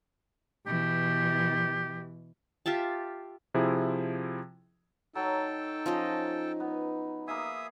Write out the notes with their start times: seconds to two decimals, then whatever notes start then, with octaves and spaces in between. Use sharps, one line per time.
0.67 B2 E3 G4
2.66 F4 G4 E5 A5
3.54 C3 F3 E4 G#4
5.15 F#3 D#4 A4 G5 A5
5.86 F3 C#4 D#5
6.60 B3
7.28 A#3 G#4 E5 D#6